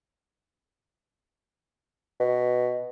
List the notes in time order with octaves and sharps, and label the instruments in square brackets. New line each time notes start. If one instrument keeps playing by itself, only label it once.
[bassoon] B2